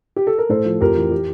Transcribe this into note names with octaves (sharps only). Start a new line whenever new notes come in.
G4
A4
A#4
A2 A4 C5
F3
F2 G4 A#4
E3
G4